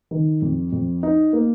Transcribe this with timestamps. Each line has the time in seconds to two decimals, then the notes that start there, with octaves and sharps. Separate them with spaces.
0.11 D#3
0.42 F2
0.72 F2
1.03 D#4
1.33 A#3